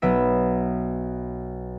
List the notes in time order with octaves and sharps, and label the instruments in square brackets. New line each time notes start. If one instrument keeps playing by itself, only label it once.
[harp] B1 B3 E5 D7